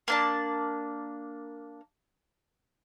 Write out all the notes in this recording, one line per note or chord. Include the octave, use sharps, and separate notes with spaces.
A#3 D4 A5